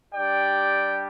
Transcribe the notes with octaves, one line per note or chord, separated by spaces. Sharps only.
G3 D4 G4 D5 G5